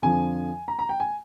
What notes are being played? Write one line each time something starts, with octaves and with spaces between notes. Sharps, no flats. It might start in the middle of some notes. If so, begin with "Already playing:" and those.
F2 D3 F3 G#5
A#5
A#5
G5
G#5